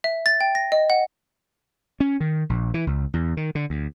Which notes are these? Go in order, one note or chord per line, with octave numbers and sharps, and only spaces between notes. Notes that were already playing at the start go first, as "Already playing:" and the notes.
E5
A6
G5
A#6
D#5
F#5
C#4
D#3
A#1
E3
C#2
E2
D#3
D3
D2